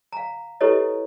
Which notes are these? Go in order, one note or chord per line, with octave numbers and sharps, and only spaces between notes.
F5 A#5
E4 G4 A4 B4 C#5 D#5